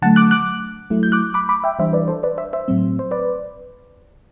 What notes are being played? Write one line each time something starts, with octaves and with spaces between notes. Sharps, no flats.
D3 F#3 A3 F#5 A5
D6 F#6
D6 F#6
F#3 A3 E4
G6
D6 F#6
B5 D6
B5 D6
E5 G5
E3 G3 D4 C5 E5
B4 D5
A4 C5
B4 D5
C5 E5
C5 E5
A2 F#3 C4
C5
B4 D5